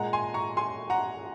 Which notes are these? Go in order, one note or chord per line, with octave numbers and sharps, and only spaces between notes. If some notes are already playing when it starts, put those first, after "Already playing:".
Already playing: A#2 G#3 F#5 A#5
G#5 C6
A#5 C#6
G#5 C6
F#5 A#5